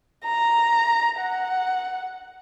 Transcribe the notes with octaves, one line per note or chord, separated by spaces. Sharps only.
A#5
F#5